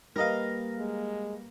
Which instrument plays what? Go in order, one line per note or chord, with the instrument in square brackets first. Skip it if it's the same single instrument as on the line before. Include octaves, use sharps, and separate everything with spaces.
[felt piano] G3 B4 [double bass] A#3 [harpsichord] A#4 D#5 F5
[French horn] G#3